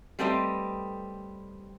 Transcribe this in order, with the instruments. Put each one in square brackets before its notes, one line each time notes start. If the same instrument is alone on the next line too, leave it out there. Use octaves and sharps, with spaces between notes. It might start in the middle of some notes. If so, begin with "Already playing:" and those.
[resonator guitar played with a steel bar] G3 A3 C4 G4 B4 D#5